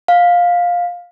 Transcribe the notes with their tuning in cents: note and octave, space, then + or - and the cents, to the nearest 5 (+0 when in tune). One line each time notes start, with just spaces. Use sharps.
F5 +10